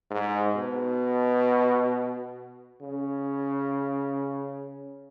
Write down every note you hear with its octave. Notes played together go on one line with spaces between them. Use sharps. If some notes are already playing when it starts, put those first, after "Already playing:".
G#2
B2
C#3